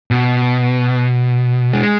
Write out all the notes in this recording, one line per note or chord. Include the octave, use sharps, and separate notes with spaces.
B2
G#3